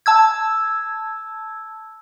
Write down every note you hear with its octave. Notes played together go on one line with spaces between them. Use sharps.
A5 E6 G#6